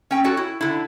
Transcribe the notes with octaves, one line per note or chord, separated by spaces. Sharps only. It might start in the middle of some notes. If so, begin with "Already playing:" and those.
C#4 G5
F#4 A4 C#5
E4
D3 E4